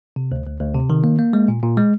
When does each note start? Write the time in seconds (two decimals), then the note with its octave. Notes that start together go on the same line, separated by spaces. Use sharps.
0.16 C3
0.32 D2
0.46 D2
0.61 D2
0.74 C3
0.90 D#3
1.04 A#3
1.19 A#3
1.33 G#3
1.48 A#2
1.63 A#2
1.77 G#3